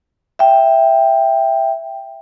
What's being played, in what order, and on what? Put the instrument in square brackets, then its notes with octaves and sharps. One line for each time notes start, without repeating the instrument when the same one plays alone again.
[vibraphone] E5 G5